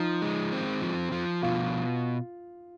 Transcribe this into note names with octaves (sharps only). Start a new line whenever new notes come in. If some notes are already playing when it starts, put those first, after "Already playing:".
Already playing: F3 D#4
G#3
C4
F3
F3
B2 F4